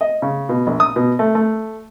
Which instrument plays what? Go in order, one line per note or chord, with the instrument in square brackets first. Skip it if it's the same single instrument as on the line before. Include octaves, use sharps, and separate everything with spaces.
[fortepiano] D#5
C#3
B2
A#1
D#6
B2
A3
A3